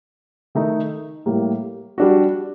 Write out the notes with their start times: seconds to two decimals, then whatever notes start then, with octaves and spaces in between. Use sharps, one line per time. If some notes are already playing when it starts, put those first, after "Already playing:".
0.55 D#3 A3 D#4
1.26 A2 G3 A#3
1.98 G3 D4 F#4